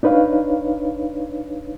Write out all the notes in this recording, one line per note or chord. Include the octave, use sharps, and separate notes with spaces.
D4 D#4 B4 C#5 F5